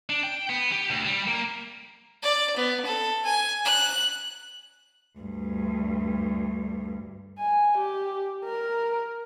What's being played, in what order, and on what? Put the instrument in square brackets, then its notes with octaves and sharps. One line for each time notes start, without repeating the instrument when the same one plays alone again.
[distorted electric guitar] D4
G5
B3
G4
D2
G3
A#3
[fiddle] D5
B3
A4
G#5
F#6
[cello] D2 G2
[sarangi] G#5
G4
A#4